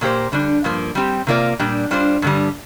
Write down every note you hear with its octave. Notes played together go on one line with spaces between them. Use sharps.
A#2 A#3 G4 C5
D3 G3 D4
G2 F3 A#3
G3 C4 G4
C3 A#3 F4 D5
A#2 G3 D4 G4
G3 D4 F4 C5
G2 D3 G3